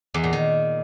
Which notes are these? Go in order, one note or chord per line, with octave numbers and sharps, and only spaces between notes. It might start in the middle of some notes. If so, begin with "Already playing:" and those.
E2
A#2
D#3